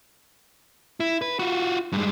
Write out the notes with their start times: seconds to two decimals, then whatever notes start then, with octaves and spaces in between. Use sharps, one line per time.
1.00 E4
1.22 B4
1.39 F4 F#4
1.92 G2 G#3